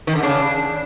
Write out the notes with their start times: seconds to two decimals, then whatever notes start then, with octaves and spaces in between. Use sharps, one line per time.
0.07 D#3
0.15 D3
0.23 C#3 D4